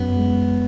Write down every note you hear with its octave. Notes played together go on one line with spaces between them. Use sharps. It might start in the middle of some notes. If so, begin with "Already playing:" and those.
Already playing: F#2 B3
G#3